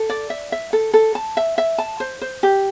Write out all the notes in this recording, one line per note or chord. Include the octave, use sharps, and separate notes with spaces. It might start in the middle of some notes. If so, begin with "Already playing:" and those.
Already playing: A4
D5
E5
E5
A4
A4
A5
E5
E5
A5
C5
C5
G4